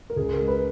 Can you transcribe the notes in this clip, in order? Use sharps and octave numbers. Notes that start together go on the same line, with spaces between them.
A#4
C#2 G#4
A#4
G#3
B4